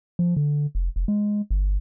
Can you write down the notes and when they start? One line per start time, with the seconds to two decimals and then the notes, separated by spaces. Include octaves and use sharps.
0.19 F3
0.37 D3
0.75 F1
0.96 F1
1.08 G#3
1.50 G1